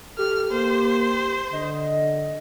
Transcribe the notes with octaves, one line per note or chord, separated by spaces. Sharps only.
G4 A4 F6
A#3 C5
D3 D#5